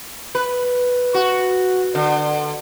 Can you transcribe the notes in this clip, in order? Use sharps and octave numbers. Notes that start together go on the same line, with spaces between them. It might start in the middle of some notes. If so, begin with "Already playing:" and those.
B4
F#4
D3